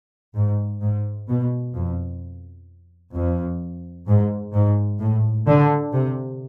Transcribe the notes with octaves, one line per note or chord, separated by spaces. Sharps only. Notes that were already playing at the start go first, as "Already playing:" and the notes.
G#2
G#2
B2
F2
F2
G#2
G#2
A2
D3
C3